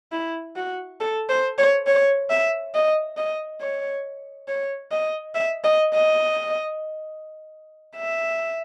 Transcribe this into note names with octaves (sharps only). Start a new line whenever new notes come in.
E4
F#4
A4
C5
C#5
C#5
E5
D#5
D#5
C#5
C#5
D#5
E5
D#5
D#5
E5